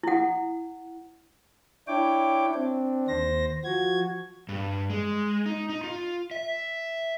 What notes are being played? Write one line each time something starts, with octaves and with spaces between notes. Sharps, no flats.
E4 F#5
D4 E4 C#5 G5 D6
C4 D4
D#2 C5 A#6
F3 F#4 G#6
G2
G#3
D#4
D#4
F4
E5